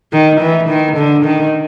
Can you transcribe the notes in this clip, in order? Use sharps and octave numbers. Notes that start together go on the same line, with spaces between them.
D#3
E3
D#3
D3
D#3